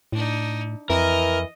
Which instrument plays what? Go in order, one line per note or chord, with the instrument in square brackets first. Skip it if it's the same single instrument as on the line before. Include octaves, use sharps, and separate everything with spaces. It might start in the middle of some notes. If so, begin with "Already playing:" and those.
[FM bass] A2 [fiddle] D4 D#4
[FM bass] F2 [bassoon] E3 [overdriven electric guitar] A#4 [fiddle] D#5